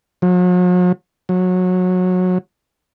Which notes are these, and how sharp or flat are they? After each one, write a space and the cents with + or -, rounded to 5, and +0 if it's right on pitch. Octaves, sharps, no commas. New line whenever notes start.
F#3 -45
F#3 -20